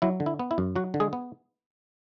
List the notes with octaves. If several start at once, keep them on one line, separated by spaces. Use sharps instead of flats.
F#3 E4
D3
E4
B3
E4
F#2
F#3 F#4
D3
G#3 G#4
B3